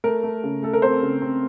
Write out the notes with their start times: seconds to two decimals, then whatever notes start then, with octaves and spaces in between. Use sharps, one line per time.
0.04 A3 A#4
0.23 A3
0.44 C#3
0.62 A3 A4
0.73 A#4
0.82 C4 C5
1.03 C#3
1.22 C4